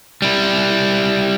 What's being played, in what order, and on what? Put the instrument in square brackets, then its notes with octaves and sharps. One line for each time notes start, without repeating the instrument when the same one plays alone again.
[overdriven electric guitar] G3 E4